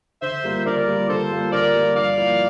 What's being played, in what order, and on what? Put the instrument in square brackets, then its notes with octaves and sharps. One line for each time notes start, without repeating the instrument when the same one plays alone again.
[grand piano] D3 [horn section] C5 E5
[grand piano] G3 A#3 F4
[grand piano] D3 [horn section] A#4 D5
[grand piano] G3 A#3 F4
[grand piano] D3 [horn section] A4 C5
[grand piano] G3 A#3 F4
[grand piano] D3 [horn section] A#4 D5
[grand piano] G3 A#3 F4
[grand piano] G2 [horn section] D5 F5
[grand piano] F3 A#3 E4